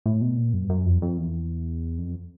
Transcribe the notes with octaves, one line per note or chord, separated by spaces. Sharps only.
A2
B2
A#2
F#2
G2
F#2
F2
F2
E2
F2